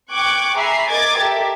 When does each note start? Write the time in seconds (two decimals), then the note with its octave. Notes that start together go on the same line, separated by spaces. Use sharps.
0.12 G5 C#6 D6 F#6 G#6 D7
0.56 G#4 E5 G#5 A#5 B5 C7
0.90 A#4 D#5 D6 G#6 A6
1.20 G4 A4 A#4 E5